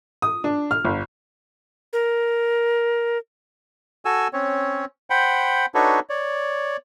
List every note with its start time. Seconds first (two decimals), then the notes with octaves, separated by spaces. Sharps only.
0.22 D#6
0.44 D4
0.71 F6
0.85 G1
1.93 A#4
4.05 F#4 A4 G#5 E6
4.33 C4 C#4 C#5
5.10 C5 F#5 G5 B5
5.75 D4 D#4 F#4 A4 B4 C#5
6.10 C#5 D5